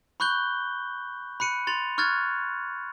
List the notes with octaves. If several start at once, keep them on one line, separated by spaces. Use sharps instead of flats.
B5 C#6 F#6 G6 G7
B5 F#6 C#7 D#7
C6 A6 F7
C#6 F6 F#6 G#6 A6